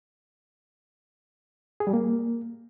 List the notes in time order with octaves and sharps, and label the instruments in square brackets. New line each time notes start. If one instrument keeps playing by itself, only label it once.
[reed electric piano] G#4
G3
A#3